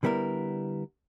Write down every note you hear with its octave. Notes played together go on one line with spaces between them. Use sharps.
D3 G3 B3 E4 A#4